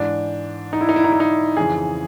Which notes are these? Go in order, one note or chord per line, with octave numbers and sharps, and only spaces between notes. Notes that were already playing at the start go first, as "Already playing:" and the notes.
Already playing: G#2 E3 D4
D#4
E4
D#4
E4
D#4
E4
D#4
F2 C#3 E3 G#4